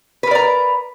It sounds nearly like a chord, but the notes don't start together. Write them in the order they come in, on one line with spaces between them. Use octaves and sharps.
B4 A#4 D5 A#5